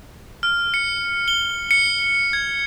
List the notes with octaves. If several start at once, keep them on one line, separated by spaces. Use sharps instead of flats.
F6
C#7
G7
C#7
G#6